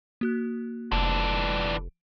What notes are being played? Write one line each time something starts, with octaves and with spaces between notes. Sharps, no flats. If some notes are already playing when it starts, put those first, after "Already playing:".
A#3 F#4 F#6
F1 E3 D4